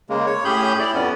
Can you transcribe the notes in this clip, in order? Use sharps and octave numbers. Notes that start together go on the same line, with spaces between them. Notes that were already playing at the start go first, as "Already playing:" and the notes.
C#3 G#3 A#3
C#5
A2 C#4 G4 G#4 B5 G6
E4 D5
F2 B3 C#4